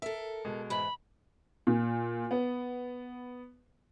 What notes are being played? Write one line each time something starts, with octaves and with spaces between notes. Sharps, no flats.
A4 A#4 E5
B2 G#3
G#2 E3 B5
A#2
B3